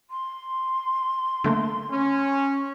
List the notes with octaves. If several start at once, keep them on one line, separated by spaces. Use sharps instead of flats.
C6
D3 A3 A#3
C#4